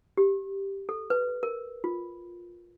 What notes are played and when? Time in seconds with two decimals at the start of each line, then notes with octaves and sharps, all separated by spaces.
0.17 G4
0.89 A4
1.10 B4
1.43 A#4
1.84 F4